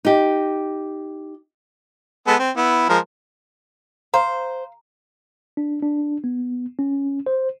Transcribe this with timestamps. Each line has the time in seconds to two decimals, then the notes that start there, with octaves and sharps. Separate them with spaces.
0.05 D#4 G4
2.27 G#3 B3 A4
2.39 C4
2.56 B3 E4
2.89 F3 G#3 A#4
4.14 C5 F5 A#5
5.57 D4
5.83 D4
6.24 B3
6.79 C#4
7.26 C5